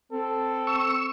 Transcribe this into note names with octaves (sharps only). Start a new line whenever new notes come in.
C4 A4
C#6 E6